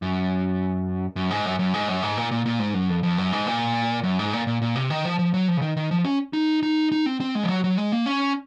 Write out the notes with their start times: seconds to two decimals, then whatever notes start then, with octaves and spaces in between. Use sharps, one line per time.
0.02 F#2
1.16 F#2
1.31 G#2
1.45 F#2
1.59 F#2
1.74 G#2
1.88 F#2
2.02 G#2
2.17 A#2
2.31 A#2
2.46 A#2
2.60 G#2
2.74 F#2
2.90 F2
3.03 F2
3.18 F#2
3.33 G#2
3.47 A#2
4.03 F#2
4.19 G#2
4.33 A#2
4.47 A#2
4.62 A#2
4.76 C3
4.90 D#3
5.05 F3
5.19 F3
5.34 F#3
5.48 F3
5.57 C#3
5.61 D#3
5.77 D#3
5.91 F3
6.05 C#4
6.33 D#4
6.63 D#4
6.92 D#4
7.06 C4
7.20 C4
7.35 G#3
7.43 F3
7.49 F#3
7.64 F#3
7.77 G#3
7.92 A#3
8.06 C#4